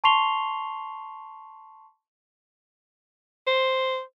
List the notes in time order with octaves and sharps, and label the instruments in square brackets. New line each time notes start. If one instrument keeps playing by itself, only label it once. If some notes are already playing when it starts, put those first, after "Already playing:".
[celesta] A5 C6 C#6 C7 F7 G7
[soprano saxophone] C5